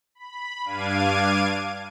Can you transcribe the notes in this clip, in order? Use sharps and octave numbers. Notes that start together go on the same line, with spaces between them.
B5
G2 D4 F5 D6 G#6 D#7